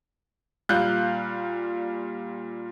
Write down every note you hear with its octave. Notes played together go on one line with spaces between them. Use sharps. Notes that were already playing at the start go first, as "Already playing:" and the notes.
A#2 G3 F5 F#6 G6